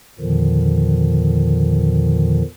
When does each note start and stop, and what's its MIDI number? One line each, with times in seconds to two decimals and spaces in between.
0.19 2.42 40
0.19 2.42 46
0.19 2.42 50
0.19 2.42 51
0.19 2.42 53